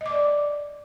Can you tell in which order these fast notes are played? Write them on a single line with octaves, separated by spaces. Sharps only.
D#5 D6 D5